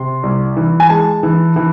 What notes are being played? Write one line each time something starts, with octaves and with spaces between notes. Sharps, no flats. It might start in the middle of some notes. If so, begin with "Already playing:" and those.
Already playing: C3 C6
C2
E3
G#5
G#3 A5
E3
E3